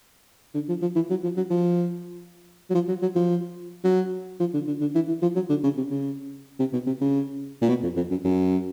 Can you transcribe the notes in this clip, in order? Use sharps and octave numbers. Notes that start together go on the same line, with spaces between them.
D3
F3
F3
E3
F#3
F3
F#3
F3
F#3
F3
F#3
F#3
F3
F#3
F3
D3
D3
D3
E3
E3
F3
F#3
D3
C#3
C3
C#3
C3
B2
C3
C#3
A#2
B2
F2
F2
F#2
F#2